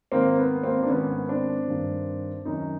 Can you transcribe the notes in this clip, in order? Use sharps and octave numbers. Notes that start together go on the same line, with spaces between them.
G#2 D#3 A#3 C4
B3
A#3 C4
D4
G#2 D#3 B3 C#4
C4 D4
G2 D#3
F#2 D#3 C#4 D#4